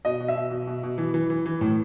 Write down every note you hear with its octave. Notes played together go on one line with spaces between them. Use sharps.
B2 D#5
B2
E5
B2
B2
B2
B2
E3
E3
E3
E3
A2